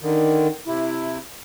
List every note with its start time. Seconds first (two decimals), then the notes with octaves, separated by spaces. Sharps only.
0.01 D3 D#3
0.67 C3 E4